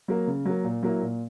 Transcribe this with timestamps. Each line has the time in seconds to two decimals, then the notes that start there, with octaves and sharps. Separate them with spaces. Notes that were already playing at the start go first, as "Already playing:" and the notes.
0.08 F#3 A#3
0.27 C#3
0.45 F#3 A#3
0.64 A#2
0.83 F#3 A#3 E4
1.01 A#2